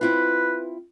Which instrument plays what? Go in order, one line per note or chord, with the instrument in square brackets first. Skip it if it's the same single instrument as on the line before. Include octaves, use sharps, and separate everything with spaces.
[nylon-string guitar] C4 E4 F4 [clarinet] B4